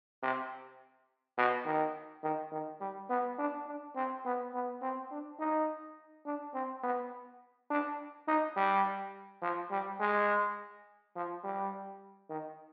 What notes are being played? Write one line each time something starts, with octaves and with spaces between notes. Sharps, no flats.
C3
B2
D#3
D#3
D#3
G3
B3
D4
D4
C4
B3
B3
C4
D4
D#4
D4
C4
B3
D4
D#4
G3
F3
G3
G#3
F3
G3
D#3